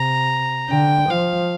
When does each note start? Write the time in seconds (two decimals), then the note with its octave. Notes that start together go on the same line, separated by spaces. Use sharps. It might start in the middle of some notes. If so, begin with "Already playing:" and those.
Already playing: C3 A#5
0.69 D3 G5
1.09 F3 F5